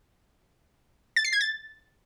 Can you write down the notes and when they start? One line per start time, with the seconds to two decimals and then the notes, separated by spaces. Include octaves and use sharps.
1.16 A6
1.25 C7
1.33 G#6
1.41 A6